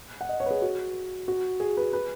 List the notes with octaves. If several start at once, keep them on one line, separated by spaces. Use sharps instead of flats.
F#5
D#5
C#5
B4
G#4
F#4
F#4
G#4
B4
B4